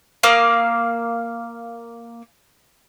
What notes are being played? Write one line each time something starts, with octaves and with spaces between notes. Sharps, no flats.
A#3 F5 D#6